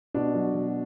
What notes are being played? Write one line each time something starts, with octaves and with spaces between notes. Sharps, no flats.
B2 D4
F#3
B2